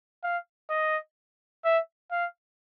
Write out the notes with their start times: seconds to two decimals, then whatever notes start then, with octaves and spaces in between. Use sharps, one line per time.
0.23 F5
0.70 D#5
1.64 E5
2.12 F5